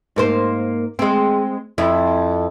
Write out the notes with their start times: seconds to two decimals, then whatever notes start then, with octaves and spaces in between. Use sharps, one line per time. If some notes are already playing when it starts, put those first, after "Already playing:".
0.16 G#2 A#3 C5
0.99 G#3 C4
1.78 F2 E4